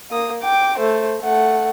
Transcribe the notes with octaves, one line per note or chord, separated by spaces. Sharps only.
A#3 D#6
G5 D6
A3 C5
A3 F#5